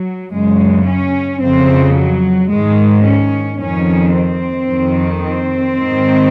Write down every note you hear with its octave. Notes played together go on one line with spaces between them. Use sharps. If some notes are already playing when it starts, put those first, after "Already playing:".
Already playing: F#3
F#2 C#3 G#3
C#4
F2 C#3 C4
F#3
G#2 D#3 G#3
C#4
F2 D#3 C#4
C4
F2 D#3
C4
G#2 D#3